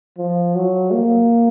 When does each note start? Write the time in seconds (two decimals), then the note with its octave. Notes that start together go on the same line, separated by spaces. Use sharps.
0.18 F3
0.55 F#3
0.91 A#3